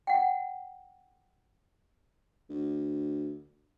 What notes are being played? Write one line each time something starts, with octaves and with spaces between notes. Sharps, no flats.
F#5 G5
D2